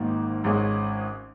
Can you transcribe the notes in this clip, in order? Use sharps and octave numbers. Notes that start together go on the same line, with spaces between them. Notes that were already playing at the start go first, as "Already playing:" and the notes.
Already playing: G#1 G#2 D#3 A#3
G#1 G#2 G#3 C#4 G#4